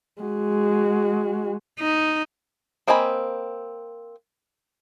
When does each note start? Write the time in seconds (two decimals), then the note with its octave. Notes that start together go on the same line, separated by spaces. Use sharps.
0.22 G#3 F#4
1.79 D#4
2.87 A#3 C4 D#5 G#5 B5